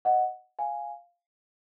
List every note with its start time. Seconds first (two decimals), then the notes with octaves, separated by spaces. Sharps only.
0.05 D#5 F#5
0.59 F5 G#5